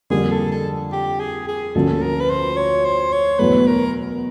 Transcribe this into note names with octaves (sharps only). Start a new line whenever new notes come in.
F2 D3 G3 A#3 G#4
A4
A4
G4
G#4
G#4
D2 D3 F3 A#3 C#4 A4
A#4
B4
C5
C#5
C5
C#5
E2 B2 F#3 A3 B4
A#4